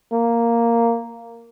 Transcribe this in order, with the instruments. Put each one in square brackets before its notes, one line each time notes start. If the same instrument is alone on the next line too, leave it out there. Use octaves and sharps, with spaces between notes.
[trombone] A#3